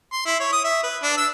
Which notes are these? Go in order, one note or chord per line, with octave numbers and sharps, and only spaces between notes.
C6
E4
C#5
D#6
E5
B4
D4
E6